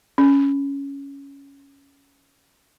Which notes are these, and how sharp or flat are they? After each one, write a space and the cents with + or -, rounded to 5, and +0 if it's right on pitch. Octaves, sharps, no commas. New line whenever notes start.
C#4 +5